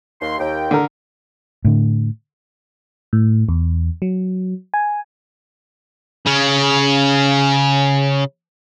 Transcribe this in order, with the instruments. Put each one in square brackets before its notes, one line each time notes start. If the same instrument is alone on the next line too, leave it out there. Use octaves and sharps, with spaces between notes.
[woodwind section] D#2 C6
D#2 G5
[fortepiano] D3 A#4
[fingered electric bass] A2 D3
[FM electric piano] A2
E2
F#3
G#5
[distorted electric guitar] C#3 C#4